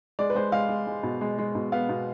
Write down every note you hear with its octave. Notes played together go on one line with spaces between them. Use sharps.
G#3 D5
B4
G#3 C5
G#3 F5
G#3
G#3
B2
G#3
G#3
B2
B3 F5
B2